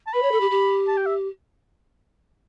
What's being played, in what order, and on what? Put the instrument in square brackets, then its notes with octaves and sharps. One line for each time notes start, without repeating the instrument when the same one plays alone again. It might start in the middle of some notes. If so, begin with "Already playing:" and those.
[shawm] A5
[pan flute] B4 [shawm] B5
[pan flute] C#5
A4
G4
G4
[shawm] A5
G5
E5